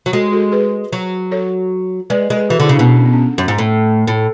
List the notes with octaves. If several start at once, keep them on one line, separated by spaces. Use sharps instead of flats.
F#3
G#3 F#4 A4
F#4 A4
G#4 B4
F#3
A4 C#5
G#3 B4 D5
G#3
G#4 B4
E3 F#4 A4
D3 E4 G#4
C#3 D4
B2 C#4 E4
D4
C#4
B3
C#4
F#2
G#2
A2
A2